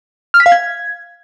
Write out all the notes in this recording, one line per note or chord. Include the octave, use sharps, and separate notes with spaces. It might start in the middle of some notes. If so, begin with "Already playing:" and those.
F6
B6
F5
G#6